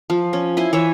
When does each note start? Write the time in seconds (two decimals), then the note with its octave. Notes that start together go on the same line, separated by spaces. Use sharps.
0.10 F3
0.33 C#4
0.57 E4 G#5 C6
0.73 E3 C#5 E5